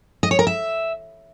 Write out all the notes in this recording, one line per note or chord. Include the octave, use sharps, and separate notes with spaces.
D#5
C#5
A#4
E5